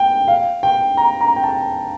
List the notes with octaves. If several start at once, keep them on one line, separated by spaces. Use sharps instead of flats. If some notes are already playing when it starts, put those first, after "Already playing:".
Already playing: G5
F5
G5
A#5
A#5
G5
A5